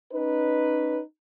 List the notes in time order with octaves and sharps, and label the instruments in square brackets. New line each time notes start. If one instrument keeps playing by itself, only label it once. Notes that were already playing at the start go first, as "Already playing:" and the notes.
[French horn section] C#4 D#4 B4